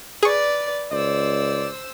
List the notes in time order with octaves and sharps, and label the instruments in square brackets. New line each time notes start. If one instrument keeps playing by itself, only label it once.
[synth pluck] G#4 C#6 [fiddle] B4 D5
[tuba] C#2 [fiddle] C5 E6 [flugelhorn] D5